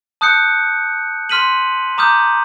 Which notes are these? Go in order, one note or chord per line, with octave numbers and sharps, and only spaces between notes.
A5 D#6 F#6 G6 C#7
C6 F6 B6 D#7 F#7
A#5 D6 D#6 F6 G6